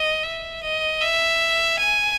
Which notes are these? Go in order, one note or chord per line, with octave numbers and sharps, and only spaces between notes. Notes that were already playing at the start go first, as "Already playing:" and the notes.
Already playing: D#5
E5
D#5
E5
G#5